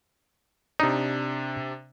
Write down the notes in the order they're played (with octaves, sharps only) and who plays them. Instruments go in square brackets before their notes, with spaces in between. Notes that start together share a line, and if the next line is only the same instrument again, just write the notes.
[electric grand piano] C3 D4 [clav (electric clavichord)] D#4